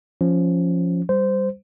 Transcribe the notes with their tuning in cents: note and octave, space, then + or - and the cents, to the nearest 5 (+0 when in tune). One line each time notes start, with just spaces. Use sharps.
F3 +0 C#4 +0
G3 +0 C5 -15